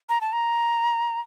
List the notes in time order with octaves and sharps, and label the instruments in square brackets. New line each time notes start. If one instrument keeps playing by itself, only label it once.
[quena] A#5
A5
A#5